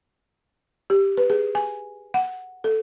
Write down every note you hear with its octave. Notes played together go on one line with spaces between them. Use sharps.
G4
B4
G#4
G#5
F#5
A4